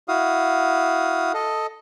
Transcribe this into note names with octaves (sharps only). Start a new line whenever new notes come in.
E4 F#4 F5 D#6
A4 D#5